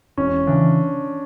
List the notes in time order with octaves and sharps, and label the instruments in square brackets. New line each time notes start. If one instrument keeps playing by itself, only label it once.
[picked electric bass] E1 [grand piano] C#4
[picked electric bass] C#3 E3 [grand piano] D4